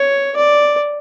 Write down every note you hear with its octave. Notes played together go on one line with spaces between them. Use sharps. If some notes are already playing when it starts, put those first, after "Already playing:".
Already playing: C#5
D5